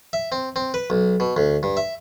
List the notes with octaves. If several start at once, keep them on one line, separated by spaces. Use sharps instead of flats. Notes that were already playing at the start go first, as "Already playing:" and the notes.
E5
C4
C4
B4
B1
B2
D2
G2
E5